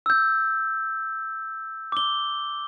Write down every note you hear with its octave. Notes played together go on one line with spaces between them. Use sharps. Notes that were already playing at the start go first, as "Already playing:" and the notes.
E6 G6
D6 G7